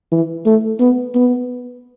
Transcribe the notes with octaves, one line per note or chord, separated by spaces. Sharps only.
E3
A3
B3
B3